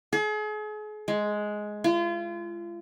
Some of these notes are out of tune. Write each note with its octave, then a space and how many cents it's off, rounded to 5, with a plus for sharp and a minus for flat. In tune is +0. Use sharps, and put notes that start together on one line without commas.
G#4 +40
G#3 +10
F4 -35